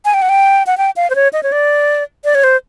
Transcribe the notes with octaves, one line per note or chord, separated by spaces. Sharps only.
G#5
G5
F#5
G5
F#5
G5
F5
C5
C#5
D#5
C#5
D5
D5
C#5
C5